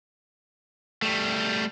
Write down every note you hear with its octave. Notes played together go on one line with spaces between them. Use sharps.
G3 A3